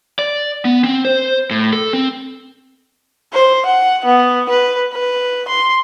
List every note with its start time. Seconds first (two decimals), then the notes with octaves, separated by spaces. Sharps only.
0.19 D5
0.65 B3
0.84 C4
1.05 C5
1.51 A2
1.73 A4
1.93 C4
3.33 C5
3.66 F#5
4.05 B3
4.49 B4
4.93 B4
5.48 C6